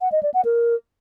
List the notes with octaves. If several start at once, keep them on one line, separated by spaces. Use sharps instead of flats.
F#5
D#5
D5
F#5
A#4